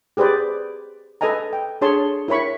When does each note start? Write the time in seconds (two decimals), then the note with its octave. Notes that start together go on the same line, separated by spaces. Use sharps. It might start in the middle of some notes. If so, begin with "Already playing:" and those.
0.17 G4 G#4 B4 C5 D5
1.21 A4 B4 D#5 G#5 A#5
1.53 G5
1.81 D4 G#4 A4 C#5 A5 C6
2.28 E4 A#4 C#5 B5 C#6